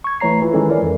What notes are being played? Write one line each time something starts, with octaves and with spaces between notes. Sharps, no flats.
C#6 G#6
E3 A3 C#5 A#5 C7
E3 F4
D#3 E3 G#3 C#4 A4
C#4 E4 A#4 C#5 D5
F2 G#3